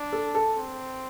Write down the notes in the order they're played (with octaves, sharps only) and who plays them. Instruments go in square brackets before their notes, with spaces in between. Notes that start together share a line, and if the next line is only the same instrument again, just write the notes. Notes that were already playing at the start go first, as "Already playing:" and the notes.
Already playing: [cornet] D4
[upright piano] A4
A4
[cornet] C4